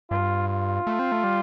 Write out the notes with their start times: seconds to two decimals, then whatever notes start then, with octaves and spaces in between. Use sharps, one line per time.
0.11 G2 F4
0.49 F4
0.87 A3
0.99 C4
1.12 A3
1.24 G3